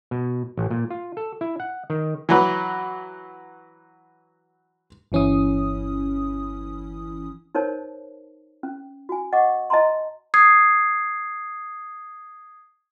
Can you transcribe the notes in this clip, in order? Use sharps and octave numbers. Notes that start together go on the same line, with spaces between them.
B2
A1
A#2
F4
A4
E4
F#5
D#3
E3 F#3 B4
G1 E3 C#4 E4 D#6
D#4 A#4 C5 C#5 A5
C#4
F#4 G#5
D#5 F#5 C#6 D6
D#5 A5 A#5 C6
D#6 G#6 C7